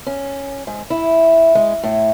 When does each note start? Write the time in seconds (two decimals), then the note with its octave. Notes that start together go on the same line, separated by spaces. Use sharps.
0.07 C#4
0.67 G#2
0.90 E4
1.55 G#3
1.83 A2